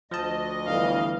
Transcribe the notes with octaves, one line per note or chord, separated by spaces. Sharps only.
D2 F3 D#5 A5
G1 D3 E3 F5